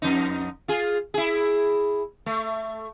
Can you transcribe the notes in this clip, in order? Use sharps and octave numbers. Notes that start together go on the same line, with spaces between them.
F2 D#4
F4 G#4
E4 G#4
A3